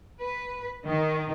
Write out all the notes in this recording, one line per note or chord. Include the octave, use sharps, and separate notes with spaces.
B4
D#3